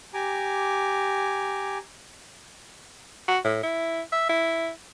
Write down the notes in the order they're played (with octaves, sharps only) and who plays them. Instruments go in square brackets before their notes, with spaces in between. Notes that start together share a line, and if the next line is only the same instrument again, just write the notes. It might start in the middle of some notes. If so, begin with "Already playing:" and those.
[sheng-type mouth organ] G4 G#5 A#5 D6
[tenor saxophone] F#4
A2
E4
E5
E4